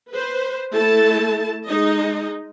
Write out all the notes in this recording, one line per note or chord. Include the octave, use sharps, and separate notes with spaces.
B4 C5
A3 E4 A4 A5
G#3 D#4 D#5